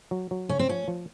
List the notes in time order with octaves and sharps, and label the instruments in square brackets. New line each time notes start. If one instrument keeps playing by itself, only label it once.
[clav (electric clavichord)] F#3
F#3
[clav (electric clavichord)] C#3 [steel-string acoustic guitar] C#4
[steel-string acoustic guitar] C4
[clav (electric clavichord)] F3 [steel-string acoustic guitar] C#4
[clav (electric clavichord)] F3